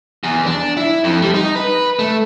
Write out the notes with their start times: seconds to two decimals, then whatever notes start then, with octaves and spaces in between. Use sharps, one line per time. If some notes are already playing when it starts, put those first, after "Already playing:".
0.24 E2
0.46 D4
0.77 E4
1.04 F2
1.22 G3
1.34 D#4
1.55 B4
1.99 A3